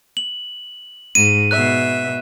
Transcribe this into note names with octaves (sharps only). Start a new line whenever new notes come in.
F#7
G#2 D#7
B2 E5 F#6